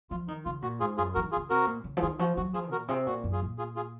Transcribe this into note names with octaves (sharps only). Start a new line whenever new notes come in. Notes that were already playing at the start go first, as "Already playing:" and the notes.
F3 F4
D#3 D#4
C#3 F4
A#2 F#4
G#2 F4 G#4
F#2 F4 G#4
F3 F#4 A#4
D#3
F4 G#4
C#3
C3 F#4 A#4
A#2
C#3
F3
D#3 F4 G#4
F3 F#4
F#3 F#4
F3 F4 G#4
A#2 F#4 A#4
C3 F4 G#4
A#2 F#4
F#2
F4 G#4
A#2
F4 G#4
F4 G#4